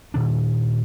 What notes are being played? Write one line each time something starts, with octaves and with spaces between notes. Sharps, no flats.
A#2 D#3 D4